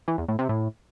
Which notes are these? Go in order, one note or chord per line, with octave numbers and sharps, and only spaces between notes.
E3
E2
A2
C3
A2